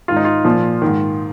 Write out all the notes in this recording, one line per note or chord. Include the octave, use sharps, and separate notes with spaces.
G#2 D#3 F4
D#4
F4
A#2 F3
G#2 D#3